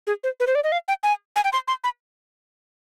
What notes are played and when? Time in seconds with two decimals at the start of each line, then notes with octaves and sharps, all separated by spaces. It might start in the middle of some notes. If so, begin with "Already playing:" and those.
0.07 G#4
0.24 C5
0.40 B4
0.47 C5
0.55 D5
0.64 D#5
0.72 F5
0.88 G5
1.03 G#5
1.36 G#5
1.44 G5
1.53 C6
1.68 C6
1.84 B5